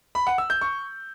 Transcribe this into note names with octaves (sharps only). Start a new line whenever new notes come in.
B5
F#5
E6
G6
C#6